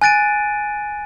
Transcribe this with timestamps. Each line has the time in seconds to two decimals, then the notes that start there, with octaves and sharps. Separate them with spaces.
0.02 G#5 F#6 A6 D7 D#7